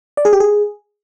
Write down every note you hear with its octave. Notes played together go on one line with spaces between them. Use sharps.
D5
G#4
G4
G#4